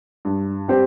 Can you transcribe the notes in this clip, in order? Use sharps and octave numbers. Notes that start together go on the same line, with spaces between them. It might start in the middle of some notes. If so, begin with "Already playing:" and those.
G2
G3 C4 G4